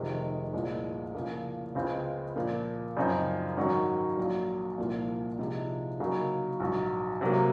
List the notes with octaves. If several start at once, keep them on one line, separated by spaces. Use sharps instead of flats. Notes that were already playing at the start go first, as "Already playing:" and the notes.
Already playing: F1 F2 C3 D#3 G#3
C2 A#2 F3 G#3
C#3 F3 A#3
C#2 C#3 G#3 C4 F4
A#2 F3 A#3
F#2 C#3 F3 C4 D#4
G#2 D#3 F#3 C#4 F#4
A#1 A#2 F#3
C2 A#2 F3 A#3 F4
C3 F3 G#3 D#4
C#3 F#3 A#3 D#4 A#4
A#1 G#2 F#3
C3 F#3 A#3